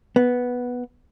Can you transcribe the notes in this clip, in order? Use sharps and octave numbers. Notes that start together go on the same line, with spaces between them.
B3